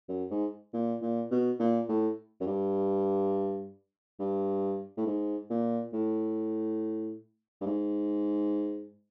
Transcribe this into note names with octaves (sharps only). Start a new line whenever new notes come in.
F#2
G#2
A#2
A#2
B2
A#2
A2
F#2
G2
G2
A2
G#2
A#2
A2
G2
G#2